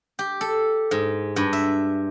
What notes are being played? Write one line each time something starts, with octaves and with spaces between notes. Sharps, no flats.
G4
A4
G#2
G2
E5